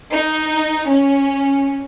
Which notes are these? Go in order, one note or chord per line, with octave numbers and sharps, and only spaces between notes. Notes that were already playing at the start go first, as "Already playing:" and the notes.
D#4
C#4